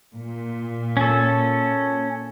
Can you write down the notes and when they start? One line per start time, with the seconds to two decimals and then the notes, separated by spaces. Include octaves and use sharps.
0.16 A#2
0.97 C#4 A4